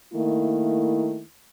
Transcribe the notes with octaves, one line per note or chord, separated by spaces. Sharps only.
D#3 A3 A#3 E4